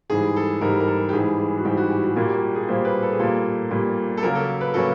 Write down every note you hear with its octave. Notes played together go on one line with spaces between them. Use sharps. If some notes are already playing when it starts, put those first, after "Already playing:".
G#2 E3 G3 G#4
A4
G#2 E3 G3 A#4
A#4
A4
G4
G#2 E3 G3 G#4
G#4
F#4
G#2 E3 G3 G4
F#4
G4
F#4
A#2 G3 A#3 F#4
G4
G#4
A#2 G3 A#3 C5
B4
A4
G#4
A#2 G3 A#3 A4
A#2 G3 A#3
A4
C#3 F#3 A#3 C#4 F#4 A#4
A4
B4
C#3 F#3 A#3 C#4 F#4 A4